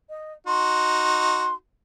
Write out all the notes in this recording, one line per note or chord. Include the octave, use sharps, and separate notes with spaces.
D#5
D#4 F#4 C6